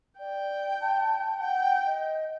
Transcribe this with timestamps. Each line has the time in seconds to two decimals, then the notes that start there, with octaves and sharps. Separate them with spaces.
0.19 D5 G5
0.81 A5
1.40 F#5 G5
1.86 D#5